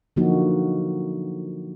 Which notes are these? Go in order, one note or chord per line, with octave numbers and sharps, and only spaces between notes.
D3 F3 F#3 A#3 D#4 F#4